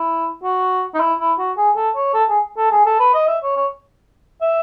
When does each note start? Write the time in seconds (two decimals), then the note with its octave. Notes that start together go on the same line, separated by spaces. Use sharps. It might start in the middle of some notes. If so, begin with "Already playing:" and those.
Already playing: E4
0.43 F#4
0.94 D#4
1.00 E4
1.20 E4
1.38 F#4
1.57 G#4
1.76 A4
1.96 C#5
2.14 A4
2.29 G#4
2.57 A4
2.71 G#4
2.86 A4
3.00 B4
3.14 D#5
3.28 E5
3.43 C#5
3.56 C#5
4.41 E5